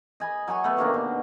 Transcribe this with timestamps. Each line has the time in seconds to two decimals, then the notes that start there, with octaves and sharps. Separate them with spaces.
0.20 D#5 G#5 B5
0.48 F#3 C#5 G#5 C#6
0.64 A3 B3
0.77 C3 D#3 A#3 D4
0.94 B2